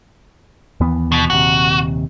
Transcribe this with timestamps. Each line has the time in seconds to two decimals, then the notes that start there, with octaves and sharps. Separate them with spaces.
0.80 D#2 E3 B3
1.12 B2
1.30 D#1 D#2 C3 F#4